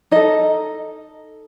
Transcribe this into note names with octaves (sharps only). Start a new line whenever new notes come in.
D#4 A4 D#5